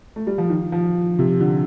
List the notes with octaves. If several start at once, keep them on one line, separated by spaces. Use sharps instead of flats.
A3
G3
F3
D#3
F3
C3
D3